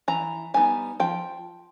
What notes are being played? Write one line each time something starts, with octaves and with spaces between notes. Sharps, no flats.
E3 A#5
G3 B3 D#4 G#5
F3 G5